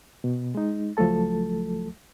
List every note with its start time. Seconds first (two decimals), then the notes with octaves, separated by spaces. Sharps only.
0.24 B2
0.55 G#3 D#4
0.97 C#2 F3 F#3 A3 A4 A5